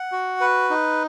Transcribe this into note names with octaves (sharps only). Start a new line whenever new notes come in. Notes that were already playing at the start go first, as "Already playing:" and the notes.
Already playing: F#5
F#4
B4
D#4